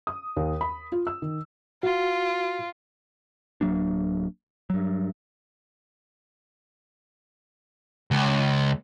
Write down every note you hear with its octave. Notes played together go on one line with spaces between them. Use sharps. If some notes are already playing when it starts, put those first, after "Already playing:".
D#6
D#2
B5
F4
E6
D#3
F4 F#4
D1 F#3 A#3 D4
G2 F#3
C#2